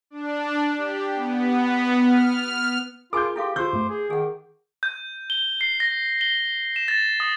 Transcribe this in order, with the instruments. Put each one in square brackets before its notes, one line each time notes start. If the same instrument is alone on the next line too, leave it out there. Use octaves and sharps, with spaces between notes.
[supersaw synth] D4
G4
B3
F6
[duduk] F4 [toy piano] G#4 A#4 G#5 [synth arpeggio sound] B5 [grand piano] D6 G6
[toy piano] E4 A4 F5 [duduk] G4 [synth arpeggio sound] A#5 C6
[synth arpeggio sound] D3 F4 [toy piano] G4 C#6 E6 [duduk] C5 [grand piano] G6
[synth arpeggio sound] G2 A3
[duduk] G#4
[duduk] D#3 [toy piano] G#4 F#5
[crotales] G6
G7
C7
A#6
G7
E7
A6
D#6